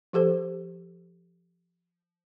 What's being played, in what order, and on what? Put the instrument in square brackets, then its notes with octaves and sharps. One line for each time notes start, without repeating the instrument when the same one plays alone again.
[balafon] F3 G4 A4 C5